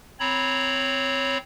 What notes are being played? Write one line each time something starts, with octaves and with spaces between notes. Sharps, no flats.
C4 C#5 A#5 B5